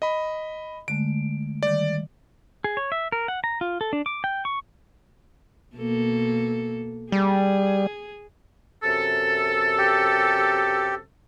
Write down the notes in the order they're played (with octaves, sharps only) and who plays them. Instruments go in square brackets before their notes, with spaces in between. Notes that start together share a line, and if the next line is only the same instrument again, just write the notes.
[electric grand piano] D#5 B5
[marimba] D3 G#3 A3 [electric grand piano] D7
[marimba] D#3 G3 [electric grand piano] D5
[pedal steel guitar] G#4
C#5
E5
A#4
F#5
A#5
F4
A4
D4
D6
G5
C#6
[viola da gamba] B2 A#3 A4
[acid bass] G3 [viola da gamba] G#4
[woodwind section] F#2 C3 A4
[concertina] G4